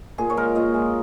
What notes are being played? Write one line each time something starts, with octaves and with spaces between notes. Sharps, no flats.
A#2 G#4
C#5
G#3 A#4
A#2 D#5
G#3